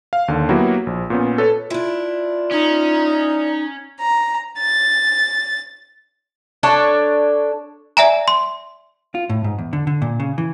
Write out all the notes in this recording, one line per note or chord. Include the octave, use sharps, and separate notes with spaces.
F5
D#2 D3
F#3 A#3 B3 E4 F#4 G4
A#1
A#2 B3 C#4
A4 B4 C#5
D4 E4 F4
C#4 D#4
A#5
A6
D4 A4 C#5
D5 E5 G#5 A#5
C6
F4
A2
G#2
E2
D3
D3
A#2
C#3
E3